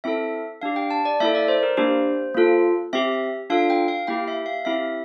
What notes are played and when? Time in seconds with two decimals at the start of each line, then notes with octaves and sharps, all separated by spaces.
0.04 C4 E4 A4 E5
0.62 D4 G4 F5
0.76 G5
0.91 A5
1.05 D5
1.20 A#3 E4 A4 E5
1.35 D5
1.48 C5
1.63 A#4
1.77 A#3 D4 G4 C5
2.34 A#3 F4 A4
2.93 C4 G4 E5
3.50 D4 F4 A4 F5
3.70 G5
3.88 F5
4.07 A#3 E4 G4 G5
4.28 E5
4.46 F5
4.65 C4 E4 G4 E5